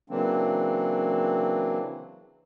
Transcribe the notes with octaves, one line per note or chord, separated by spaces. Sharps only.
C#3 E3 F#3 A#3 C4 D4